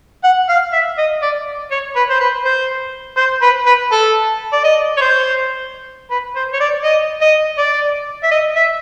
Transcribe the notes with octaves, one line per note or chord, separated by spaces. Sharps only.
F#5
F5
E5
D#5
D5
C#5
B4
C5
B4
C5
C5
B4
B4
A4
D5
D#5
C#5
C5
B4
C5
C#5
D5
D#5
D#5
D5
E5
D#5
E5